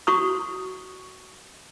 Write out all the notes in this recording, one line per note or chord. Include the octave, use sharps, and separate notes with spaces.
F#4 C#6 D#6